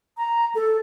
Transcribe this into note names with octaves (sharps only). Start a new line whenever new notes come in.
A#5
A4